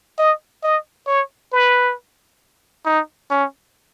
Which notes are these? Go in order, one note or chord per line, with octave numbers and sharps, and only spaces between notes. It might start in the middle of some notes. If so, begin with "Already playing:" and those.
D#5
D#5
C#5
B4
D#4
C#4